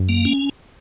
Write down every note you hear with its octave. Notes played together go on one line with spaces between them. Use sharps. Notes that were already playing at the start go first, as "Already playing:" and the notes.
Already playing: F#2
A#3
C#4